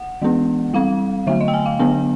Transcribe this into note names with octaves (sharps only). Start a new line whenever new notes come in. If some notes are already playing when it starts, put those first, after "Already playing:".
Already playing: F#5
E3 G#3 B3 D4
G3 C4 F5
D3 F#3 A3 E5
D#5
G5
G#5
F5
D3 F#3 B3 D4 G#5